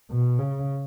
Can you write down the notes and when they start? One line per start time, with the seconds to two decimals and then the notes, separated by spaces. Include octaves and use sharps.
0.10 B2
0.38 C#3